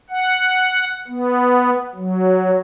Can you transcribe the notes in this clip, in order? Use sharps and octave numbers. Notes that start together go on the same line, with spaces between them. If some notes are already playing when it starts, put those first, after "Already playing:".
F#5
B3
F#3